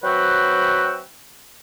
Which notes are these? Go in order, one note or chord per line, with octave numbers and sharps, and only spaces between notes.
F#3 C4 F#4 B4 E5 G5